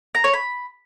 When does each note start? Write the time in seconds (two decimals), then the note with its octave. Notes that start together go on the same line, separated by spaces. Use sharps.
0.15 A#5
0.24 C#5
0.33 B5